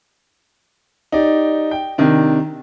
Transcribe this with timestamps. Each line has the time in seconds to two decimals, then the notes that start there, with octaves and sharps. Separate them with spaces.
1.12 D#4 G4 D5
1.71 G5
1.98 C3 D#3 D4